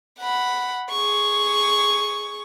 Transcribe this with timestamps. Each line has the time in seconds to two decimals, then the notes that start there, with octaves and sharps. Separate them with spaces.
0.19 F#5 B5
0.90 G#4 C#6